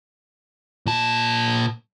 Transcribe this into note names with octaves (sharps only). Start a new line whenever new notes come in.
A#2 A5